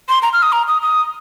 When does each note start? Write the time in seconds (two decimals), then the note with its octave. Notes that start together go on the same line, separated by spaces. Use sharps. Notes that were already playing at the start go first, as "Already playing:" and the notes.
0.09 C6
0.22 A#5
0.33 F6
0.43 D#6
0.52 A#5
0.68 D#6
0.82 D#6